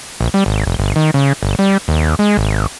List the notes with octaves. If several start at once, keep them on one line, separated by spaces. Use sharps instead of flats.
A#1
G3
G#1
F1
G1
D#3
C#3
G1
G3
D#2
G#3
G#1